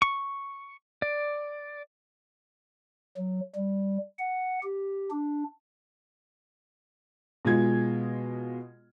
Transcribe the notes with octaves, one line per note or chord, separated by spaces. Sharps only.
C#6
D5
F#3
G3
F#5
G4
D4
B2 G#3 F4 G#6